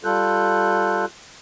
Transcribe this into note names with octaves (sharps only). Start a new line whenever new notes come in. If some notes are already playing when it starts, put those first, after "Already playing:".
G3 F4 A4 F#6 G6